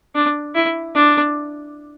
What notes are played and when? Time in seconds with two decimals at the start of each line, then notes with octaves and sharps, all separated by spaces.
0.15 D4
0.55 E4
0.95 D4